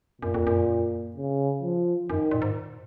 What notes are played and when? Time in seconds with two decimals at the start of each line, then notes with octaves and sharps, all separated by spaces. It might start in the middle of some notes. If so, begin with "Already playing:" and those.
0.22 F#2 A#2
0.34 F2
0.47 F#2
1.16 C#3
1.63 F3
2.09 F#2 D#3
2.31 A#2
2.42 G#2